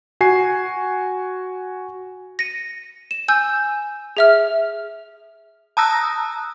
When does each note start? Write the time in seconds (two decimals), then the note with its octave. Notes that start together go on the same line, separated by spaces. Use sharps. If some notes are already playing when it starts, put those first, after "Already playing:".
0.21 F#4 G#5 C7
2.39 A#6 C#7 D#7
3.11 E7
3.28 G#5 E6 G6
4.17 G#4 E5 F6
5.77 A5 A#5 D#6 E6 F#6 A#6